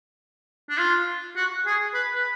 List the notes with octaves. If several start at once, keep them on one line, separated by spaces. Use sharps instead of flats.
D4
F4
F#4
G#4
B4
B4